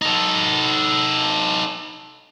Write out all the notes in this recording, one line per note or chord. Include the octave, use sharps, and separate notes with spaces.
D#4 A4